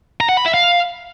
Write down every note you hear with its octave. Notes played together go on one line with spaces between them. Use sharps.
A#5
F#5
B5
E5
F5